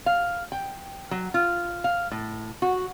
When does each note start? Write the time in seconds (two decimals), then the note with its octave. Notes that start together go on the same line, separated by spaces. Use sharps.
0.06 F5
0.52 G5
1.11 F#3
1.34 F4
1.84 F5
2.11 A2
2.62 F#4